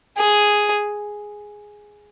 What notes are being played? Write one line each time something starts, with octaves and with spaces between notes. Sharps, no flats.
G#4